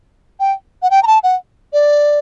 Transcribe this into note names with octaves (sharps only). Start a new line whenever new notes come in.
G5
F#5
G5
A#5
A5
F#5
D5